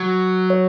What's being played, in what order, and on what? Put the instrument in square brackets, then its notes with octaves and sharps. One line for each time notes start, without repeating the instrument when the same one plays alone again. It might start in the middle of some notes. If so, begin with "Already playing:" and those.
Already playing: [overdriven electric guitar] F#3
[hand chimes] C#5